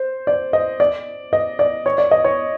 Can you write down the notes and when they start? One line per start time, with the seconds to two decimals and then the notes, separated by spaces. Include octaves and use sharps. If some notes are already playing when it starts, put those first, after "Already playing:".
Already playing: C5
0.27 D5
0.53 D#5
0.80 D5
1.33 D#5
1.59 D5
1.86 C#5
1.98 D5
2.11 D#5
2.25 C#5